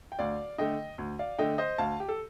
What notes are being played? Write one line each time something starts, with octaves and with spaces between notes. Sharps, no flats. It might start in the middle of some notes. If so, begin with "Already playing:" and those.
G5
D2 D5 F5
D3 A3 D#5 G5
D2
D5 F5
D3 A3 D#5 G5
C5 D#5
D2 F5 A5
G4
A4